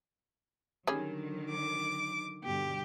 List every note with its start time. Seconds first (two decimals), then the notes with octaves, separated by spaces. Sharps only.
0.87 D3 D#3 F#3 G3 C#4 G#4
1.49 D6
2.44 G2 B2 D3 G4